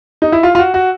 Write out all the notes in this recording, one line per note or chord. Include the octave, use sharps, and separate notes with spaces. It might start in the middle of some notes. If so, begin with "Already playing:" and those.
D#4
E4
F4
F4
F#4
F#4